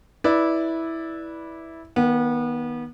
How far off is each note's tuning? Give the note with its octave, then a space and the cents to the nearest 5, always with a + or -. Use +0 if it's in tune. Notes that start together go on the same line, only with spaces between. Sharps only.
E4 -10 B4 -10 D5 +0
D#3 +5 B3 -30